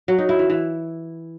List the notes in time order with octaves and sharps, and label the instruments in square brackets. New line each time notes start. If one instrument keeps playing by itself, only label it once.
[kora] F#3
D#4
E4
E3
E3